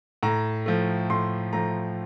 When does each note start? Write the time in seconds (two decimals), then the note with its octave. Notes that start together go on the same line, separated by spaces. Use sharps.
0.23 A2 A#5
0.66 F3 A3
1.10 A2 C6
1.53 F3 A3 A#5